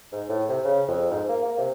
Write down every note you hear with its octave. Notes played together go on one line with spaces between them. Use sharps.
G#2
A2
C3
C#3
F2
G#2
A#3
A#3
C3